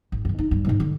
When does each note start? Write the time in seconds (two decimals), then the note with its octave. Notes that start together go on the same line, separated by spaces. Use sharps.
0.12 G#1
0.25 G2 D#3
0.39 D#4
0.51 G2 G3
0.65 D1 G#2
0.80 D3